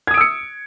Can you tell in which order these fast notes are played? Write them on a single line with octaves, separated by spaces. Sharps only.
G#6 D#6 D7 E6 C#7